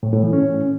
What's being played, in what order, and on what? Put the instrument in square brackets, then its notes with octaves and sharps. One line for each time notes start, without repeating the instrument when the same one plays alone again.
[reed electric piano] A2
A2
E3
C#4